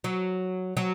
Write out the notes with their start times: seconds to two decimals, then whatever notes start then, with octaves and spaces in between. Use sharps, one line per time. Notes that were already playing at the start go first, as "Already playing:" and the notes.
0.04 F#3
0.77 F#3